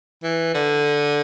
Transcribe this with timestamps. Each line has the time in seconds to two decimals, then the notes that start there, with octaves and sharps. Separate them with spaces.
0.23 E3
0.54 D3